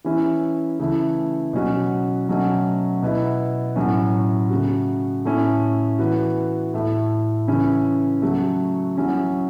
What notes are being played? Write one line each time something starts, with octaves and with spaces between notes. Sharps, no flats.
E3 C#4 E4
C#3 E3 A3 E4
B2 F#3 C#4 F#4
B2 F#3 A3 C#4
B2 B3 E4
A2 F#3 C#4
C#3 A3 F#4
A2 A3 C#4 E4
E3 B3 F#4
A2 A3 E4
C#3 E3 C#4 E4
C#3 F#3 A3 F#4
F#3 C#4 E4